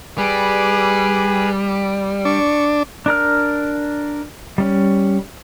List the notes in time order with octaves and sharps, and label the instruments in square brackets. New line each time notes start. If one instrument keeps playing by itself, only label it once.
[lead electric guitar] G3 [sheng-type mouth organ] G#4 B4
[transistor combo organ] D4 [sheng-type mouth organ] C#6
[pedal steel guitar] D4 A#4 F6
G3 C#4